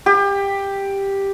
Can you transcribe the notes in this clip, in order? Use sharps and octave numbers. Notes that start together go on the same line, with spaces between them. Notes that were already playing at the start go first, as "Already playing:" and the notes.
G4